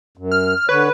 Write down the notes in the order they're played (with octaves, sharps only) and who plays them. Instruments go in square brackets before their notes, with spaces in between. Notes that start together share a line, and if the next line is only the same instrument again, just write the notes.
[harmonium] F#2
[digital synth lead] F6
[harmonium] D3 C#5 [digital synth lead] B4